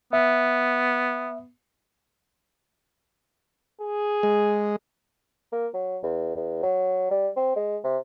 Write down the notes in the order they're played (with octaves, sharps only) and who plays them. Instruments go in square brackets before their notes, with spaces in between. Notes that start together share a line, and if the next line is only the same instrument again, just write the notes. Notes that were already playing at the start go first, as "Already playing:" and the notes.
[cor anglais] B3 [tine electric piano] E5
[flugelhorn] G#4
[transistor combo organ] G#3
[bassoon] A#3
F#3
E2
E2
F#3
G3
C4
G#3
C3